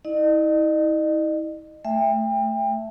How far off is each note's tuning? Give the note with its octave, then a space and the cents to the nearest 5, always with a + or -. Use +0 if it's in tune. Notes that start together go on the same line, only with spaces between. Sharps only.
E4 -40 D#5 -40
A3 +0 E5 +5 G5 +30